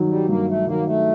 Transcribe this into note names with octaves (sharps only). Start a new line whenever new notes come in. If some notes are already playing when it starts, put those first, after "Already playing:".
Already playing: G2 D#3 F#3
G3
G2 A#3
A3
D#3 F#3 A#3
A3